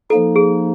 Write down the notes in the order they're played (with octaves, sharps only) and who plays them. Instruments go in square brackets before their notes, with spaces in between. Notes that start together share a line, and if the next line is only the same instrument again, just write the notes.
[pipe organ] F3 A#3 D#4 [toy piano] A4
[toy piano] G#4